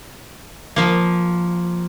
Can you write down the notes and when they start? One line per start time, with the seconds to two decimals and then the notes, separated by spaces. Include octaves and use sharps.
0.76 F3 A#3